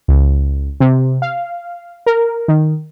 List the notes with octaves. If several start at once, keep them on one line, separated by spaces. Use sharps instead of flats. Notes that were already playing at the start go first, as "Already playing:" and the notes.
C#2
C3
F5
A#4
D#3